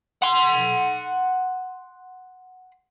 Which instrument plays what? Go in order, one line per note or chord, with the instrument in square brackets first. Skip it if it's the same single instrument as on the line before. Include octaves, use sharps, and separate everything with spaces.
[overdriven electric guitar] F#5 C6